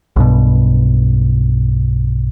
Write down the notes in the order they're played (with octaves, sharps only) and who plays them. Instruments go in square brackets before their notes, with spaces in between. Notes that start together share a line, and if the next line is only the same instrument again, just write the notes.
[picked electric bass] B1 G2 B2